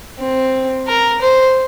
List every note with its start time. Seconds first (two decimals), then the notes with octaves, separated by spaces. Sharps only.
0.19 C4
0.87 A#4
1.21 C5